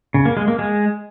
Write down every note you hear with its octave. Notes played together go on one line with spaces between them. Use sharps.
C#3
A#3
G#3
A#3
G#3